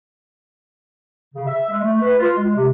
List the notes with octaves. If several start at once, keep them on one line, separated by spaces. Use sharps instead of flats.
C#3
E5
G#3
A3
B4
F4
G#3
C3